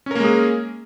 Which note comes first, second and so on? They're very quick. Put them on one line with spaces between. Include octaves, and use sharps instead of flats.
C#4 A#4 A#3 G#3 G#4